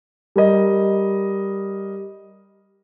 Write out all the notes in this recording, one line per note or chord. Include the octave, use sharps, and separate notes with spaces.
G3 A#4 D#5